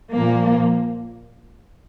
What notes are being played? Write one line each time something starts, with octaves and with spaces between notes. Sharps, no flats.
A#2 F3 A#3